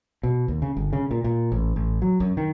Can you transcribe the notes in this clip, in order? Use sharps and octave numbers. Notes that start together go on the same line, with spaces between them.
B2
D#2
C#3
G1
C#3
A#2
A#2
A1
A1
F#3
F#2
D#3